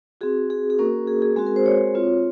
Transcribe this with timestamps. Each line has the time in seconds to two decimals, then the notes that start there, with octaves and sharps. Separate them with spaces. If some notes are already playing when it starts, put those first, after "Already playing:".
0.21 C4 F#4 G#4
0.50 G#4
0.70 G#4
0.79 A#3 C#4 F#4 A#4
1.07 G#4
1.22 G#4
1.36 G#3 C4 F#4 G#4
1.47 A#4
1.56 C5
1.66 C#5
1.95 C4 F4